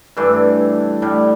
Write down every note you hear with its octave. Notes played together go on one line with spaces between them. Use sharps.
G2 E3 A3 D4
A2 G3 D4